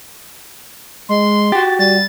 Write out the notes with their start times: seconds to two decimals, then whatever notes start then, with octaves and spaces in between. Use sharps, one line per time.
1.09 G#3 C6
1.52 F#4 G4 A6
1.79 G3 A6